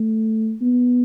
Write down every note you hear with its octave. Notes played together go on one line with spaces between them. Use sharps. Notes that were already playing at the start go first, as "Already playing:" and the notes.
Already playing: A3
B3